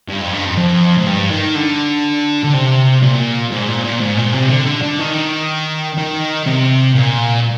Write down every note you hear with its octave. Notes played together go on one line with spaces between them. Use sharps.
G2
F2
G2
F2
F2
G#2
G2
D#3
D3
D3
C3
A#2
G#2
A#2
A#2
G#2
A#2
C3
D3
D3
D3
D#3
D#3
C3
A#2